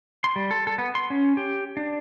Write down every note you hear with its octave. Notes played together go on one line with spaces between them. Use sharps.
C6
G3
A4
A4
B3
C6
C#4
G4
D4